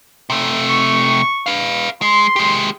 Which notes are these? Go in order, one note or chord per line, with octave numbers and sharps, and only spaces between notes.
C3 A3
C#6
B4 F5
G#3 C6
G#3 G4